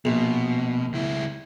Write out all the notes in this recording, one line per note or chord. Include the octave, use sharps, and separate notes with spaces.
A#1 B2
C#2 E4